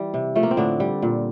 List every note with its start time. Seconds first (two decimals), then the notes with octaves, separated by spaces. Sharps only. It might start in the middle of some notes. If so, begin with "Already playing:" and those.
Already playing: E3 G3
0.14 C3
0.35 F3 A3
0.43 A#3
0.51 C4
0.57 A2 D3 D4
0.80 G3
1.02 A#2